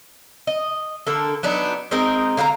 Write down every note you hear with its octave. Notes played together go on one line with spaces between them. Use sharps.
D#5
D3 A#3 A4
F#3 B3 D4 D#4
G#3 C4 D#4 A#4
D3 F4 B4 A#5